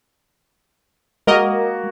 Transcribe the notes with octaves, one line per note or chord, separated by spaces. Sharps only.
G#3 A#3 F#4 A#4 D#5